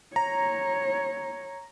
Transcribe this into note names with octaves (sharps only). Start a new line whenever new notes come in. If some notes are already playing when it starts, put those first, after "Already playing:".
C#5 A#5